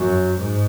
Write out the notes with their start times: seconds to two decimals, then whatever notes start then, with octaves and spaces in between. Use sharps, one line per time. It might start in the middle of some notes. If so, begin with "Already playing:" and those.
Already playing: F#2
0.38 G#2